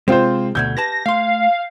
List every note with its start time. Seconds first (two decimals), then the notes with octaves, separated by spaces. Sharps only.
0.08 C3 G#3 C4 F4 C5
0.55 D2 B2 A3 G6 G#6
0.77 G4 B4 A5 A#6
1.06 A3 F5 C6